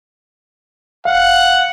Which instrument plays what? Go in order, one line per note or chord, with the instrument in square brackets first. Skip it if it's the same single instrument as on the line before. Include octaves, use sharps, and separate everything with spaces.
[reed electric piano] F5 [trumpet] F#5